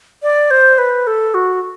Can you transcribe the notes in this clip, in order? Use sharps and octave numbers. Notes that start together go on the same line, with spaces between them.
D5
C5
B4
A4
F#4